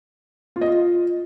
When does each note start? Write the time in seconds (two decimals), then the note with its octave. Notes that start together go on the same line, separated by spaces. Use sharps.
0.56 F4
0.61 D#5
0.67 F4